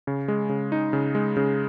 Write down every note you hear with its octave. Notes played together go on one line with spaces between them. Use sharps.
C#3
G#3
C#3
D#4
C#3
G#3
C#3